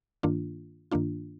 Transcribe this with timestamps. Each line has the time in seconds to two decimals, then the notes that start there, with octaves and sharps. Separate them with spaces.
0.23 G2 D#3 A#3 D4 F4
0.92 G2 D#3 A#3 D4 F4